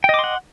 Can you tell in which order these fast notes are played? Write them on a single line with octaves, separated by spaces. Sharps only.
G5 D#5 D6 C6 F#5